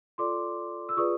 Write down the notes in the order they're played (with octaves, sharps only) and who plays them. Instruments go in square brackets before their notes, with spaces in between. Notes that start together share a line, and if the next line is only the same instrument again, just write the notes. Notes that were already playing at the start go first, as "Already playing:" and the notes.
[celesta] F4 A4 D5 C6 D6
E6
F4 G#4 B4 D5 C#6 D#6